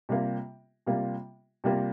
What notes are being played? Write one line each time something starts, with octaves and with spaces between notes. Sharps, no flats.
C3 G3 A#3 F4
C3 G3 A#3 F4
C3 G3 A#3 F4